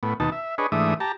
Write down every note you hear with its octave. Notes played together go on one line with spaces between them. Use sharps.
A2 B3
D#2 B2 D#4 A5
E5
D4 G#4 B4 C#5 D#5
G#2 E3 A3 D4 E5 D#6
G4 A5 A#5